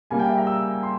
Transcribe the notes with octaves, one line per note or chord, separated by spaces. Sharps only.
C#3 G3 A#3 G#5
G5
E5
A#5
E6
C6